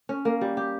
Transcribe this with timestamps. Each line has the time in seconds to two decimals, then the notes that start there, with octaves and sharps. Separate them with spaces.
0.09 C#4
0.25 A#3
0.41 G3
0.57 G4